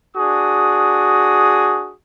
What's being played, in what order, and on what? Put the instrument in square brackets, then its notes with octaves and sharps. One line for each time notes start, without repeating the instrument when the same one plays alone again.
[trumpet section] D4 F#4 G#4 D#6